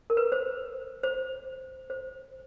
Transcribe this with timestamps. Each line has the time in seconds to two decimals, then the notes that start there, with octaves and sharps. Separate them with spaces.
0.10 A#4
0.17 B4
0.32 C5
1.03 C5
1.90 C5